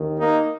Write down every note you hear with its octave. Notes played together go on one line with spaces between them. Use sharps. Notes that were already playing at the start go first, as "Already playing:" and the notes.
Already playing: D#2 D#3
A#3 D#4